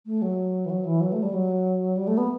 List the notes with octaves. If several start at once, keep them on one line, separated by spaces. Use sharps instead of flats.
A3
F#3
E3
F#3
E3
F#3
A3
G3
F#3
G3
A3
B3